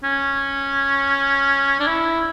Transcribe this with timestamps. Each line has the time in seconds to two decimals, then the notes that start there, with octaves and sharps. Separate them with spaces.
0.04 C#4
1.79 D4
1.87 E4